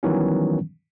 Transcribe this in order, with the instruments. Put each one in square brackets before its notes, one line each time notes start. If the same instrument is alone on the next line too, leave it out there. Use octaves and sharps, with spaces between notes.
[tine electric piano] D#3 E3 F#3 G3 B3 C#4